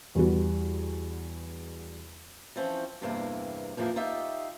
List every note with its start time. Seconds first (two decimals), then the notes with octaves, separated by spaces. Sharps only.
0.15 E2 G3 B3 F#4
2.56 E3 F3 C4 C#4
3.01 E2 G2 C3 E3 A#3
3.77 F2 A#2 E3 A#3 G4 G#4
3.96 D#4 F4 G4 E5